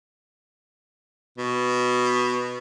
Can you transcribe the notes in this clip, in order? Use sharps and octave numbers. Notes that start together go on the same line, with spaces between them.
B2